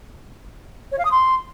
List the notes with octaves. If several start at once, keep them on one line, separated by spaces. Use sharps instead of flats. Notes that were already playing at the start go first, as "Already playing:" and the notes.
C#5
F5
D#6
C6